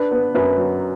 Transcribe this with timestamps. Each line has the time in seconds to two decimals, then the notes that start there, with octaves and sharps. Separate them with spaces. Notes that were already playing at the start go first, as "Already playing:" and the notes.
Already playing: D4 B4
0.11 B3
0.35 F#2 B4
0.58 F#3